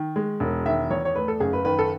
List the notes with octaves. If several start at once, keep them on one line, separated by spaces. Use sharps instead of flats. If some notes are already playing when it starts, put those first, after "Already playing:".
Already playing: D#3
G#3
E1
D#3 E5
E2 C#5
C#5
A3 B4
A4
F#1 G#4
B4
D#3 B4
A4